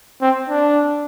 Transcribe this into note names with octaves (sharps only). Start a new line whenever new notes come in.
C4
D4